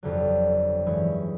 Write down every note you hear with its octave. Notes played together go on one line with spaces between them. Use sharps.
G1 F2 D3 F#3
G2 E3 G#3 C#4